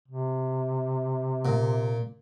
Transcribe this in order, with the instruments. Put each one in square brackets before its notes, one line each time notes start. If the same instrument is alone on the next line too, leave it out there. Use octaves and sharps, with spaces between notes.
[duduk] C3
[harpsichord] A#2